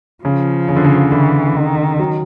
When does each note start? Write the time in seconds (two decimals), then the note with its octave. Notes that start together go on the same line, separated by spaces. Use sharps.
0.24 C#3 F3
0.69 C#3
0.76 D3
0.84 C#3
1.12 D3 E3
1.56 D#3
1.99 F#3